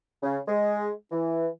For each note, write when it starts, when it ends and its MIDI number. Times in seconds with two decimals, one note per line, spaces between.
0.23 0.38 49
0.48 0.90 56
1.12 1.48 52